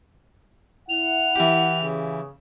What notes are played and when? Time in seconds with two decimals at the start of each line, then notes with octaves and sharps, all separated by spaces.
0.89 E4 F#5 F7
1.36 E3 G4
1.82 C#3